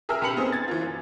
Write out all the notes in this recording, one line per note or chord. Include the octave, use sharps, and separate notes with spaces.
G#4 A#4 E5 G5 E6 F6
B1 G4 B4 B5 C#7 F#7
B3 C4 D#4 G#4 C5
G#6 A6
E3 A#3 F4
F#2